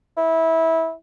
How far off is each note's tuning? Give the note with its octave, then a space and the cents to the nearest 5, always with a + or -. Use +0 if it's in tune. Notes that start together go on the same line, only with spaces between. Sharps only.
E4 -20